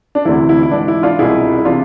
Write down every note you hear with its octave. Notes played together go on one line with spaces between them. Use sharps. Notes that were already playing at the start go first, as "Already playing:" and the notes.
D4
D2 C3 E3 E4
E4
E4
G#2 E3 D4
E4
D4 F4
C2 B2 E4 G#4
E4
C3 E3 D4 F4